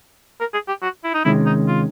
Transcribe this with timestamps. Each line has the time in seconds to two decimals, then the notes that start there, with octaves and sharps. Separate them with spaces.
0.40 A#4
0.54 G#4
0.68 G4
0.82 F#4
1.04 E4
1.14 D#4
1.24 C3 D#3 G#3 C#4 E4
1.46 D#4
1.68 F4